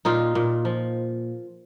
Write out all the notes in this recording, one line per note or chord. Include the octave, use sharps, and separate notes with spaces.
A#2 D#4 F4
A#2
F3